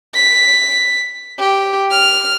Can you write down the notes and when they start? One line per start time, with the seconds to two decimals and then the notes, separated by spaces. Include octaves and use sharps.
0.15 B6
1.39 G4
1.91 F6